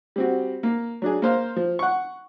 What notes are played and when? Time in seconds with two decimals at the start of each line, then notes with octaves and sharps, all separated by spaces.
0.16 G3 C4 F#4
0.63 A#3
1.02 F#3 D4 G#4
1.22 A#3 C5 F5
1.56 F3
1.79 F#5 C#6